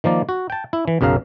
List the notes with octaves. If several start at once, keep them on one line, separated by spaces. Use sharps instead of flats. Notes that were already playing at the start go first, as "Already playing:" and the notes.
D#3 F3 A#3 D5
F#4
G5 A5
E4
E3
B1 F#2 C#3 A#4 F5